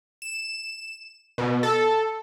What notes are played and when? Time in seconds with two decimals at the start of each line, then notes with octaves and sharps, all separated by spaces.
0.22 E7
1.38 B2
1.63 A4